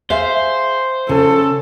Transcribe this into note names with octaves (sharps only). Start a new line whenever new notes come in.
G#4 C5 E5 F5
C#3 A4